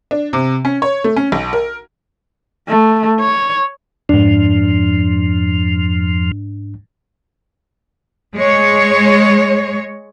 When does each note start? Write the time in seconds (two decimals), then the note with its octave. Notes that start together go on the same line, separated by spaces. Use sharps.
0.11 D4
0.33 C3
0.65 C#4
0.82 C#5
1.04 A3
1.16 C#4
1.32 B1
1.53 A#4
2.68 A3
3.19 C#5
4.09 F2 G#2 F3 D4
8.36 G#3 C#5